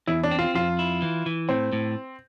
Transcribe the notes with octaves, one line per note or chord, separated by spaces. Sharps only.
E2 E4
D4
C4
F4
F2 F4
E4
E3
E3
A2 C4
A2